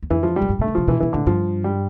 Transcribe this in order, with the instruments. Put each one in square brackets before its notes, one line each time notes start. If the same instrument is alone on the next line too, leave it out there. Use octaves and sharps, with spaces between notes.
[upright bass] E2
[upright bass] F2 [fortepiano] E3
[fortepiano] F3
G3
[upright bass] A2
G2
[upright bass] B2 [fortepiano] A3
[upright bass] D3
[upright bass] C3 [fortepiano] F3
[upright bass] B2 [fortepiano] E3
[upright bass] B2 [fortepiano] E3
[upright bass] A2 [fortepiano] D3
[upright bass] G2 [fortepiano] F3
[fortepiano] G3